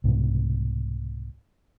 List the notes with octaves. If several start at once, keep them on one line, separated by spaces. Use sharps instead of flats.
C2 G#2 B2